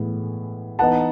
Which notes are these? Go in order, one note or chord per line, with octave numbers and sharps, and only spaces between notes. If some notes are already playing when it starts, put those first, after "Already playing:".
Already playing: A2 E3 G#3 B3
E3 B3 D#4 F#5 A5